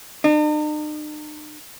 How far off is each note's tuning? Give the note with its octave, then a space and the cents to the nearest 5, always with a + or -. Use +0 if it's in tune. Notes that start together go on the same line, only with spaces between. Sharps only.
D#4 -45